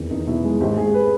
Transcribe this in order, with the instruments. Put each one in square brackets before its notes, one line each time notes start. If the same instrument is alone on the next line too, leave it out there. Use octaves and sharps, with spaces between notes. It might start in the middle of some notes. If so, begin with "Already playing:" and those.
Already playing: [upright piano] E2 D#3
E2 D#4
B2 E4
G#3
G#1 G4
G#1 G#4
B4